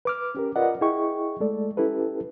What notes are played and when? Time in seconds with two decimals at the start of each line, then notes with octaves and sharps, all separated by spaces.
0.05 B4 D6 F6
0.35 C#4 G4 A#4
0.56 F4 A#4 B4 D5 D#5 F#5
0.81 E4 G#4 D#5 G5 C#6
1.40 G#3 A3 A4 D5
1.77 C#4 E4 G4 A4 B4